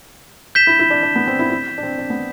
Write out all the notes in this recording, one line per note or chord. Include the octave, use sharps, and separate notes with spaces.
G6 B6 E7 G7
E4
E4
D4
D4
B3
C4
E4
E4
D4
C4
D4
B3